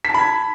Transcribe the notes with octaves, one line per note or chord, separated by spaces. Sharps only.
A5 B5 G#6 B6